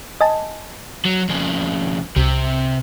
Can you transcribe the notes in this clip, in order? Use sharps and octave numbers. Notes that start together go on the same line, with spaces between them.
D#5 G#5 A5
F#3
F2 C#3
C2 C3